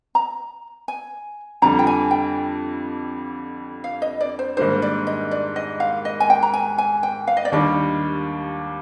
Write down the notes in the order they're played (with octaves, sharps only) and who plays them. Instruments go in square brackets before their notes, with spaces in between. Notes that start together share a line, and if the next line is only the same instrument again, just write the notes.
[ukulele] A#5
G#5
[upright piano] F2 D3 G3 [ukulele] A#5
[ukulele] G5
G#5
G5
F5
D#5
D5
C5
[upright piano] G#2 D#3 G3 A#3 D4 [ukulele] C5
[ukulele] D5
D#5
D5
D#5
F5
D#5
G#5
G5
A#5
G#5
G#5
G5
F5
D#5
D5
[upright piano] D#2 D#3 G3 D4 G4 [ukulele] D#5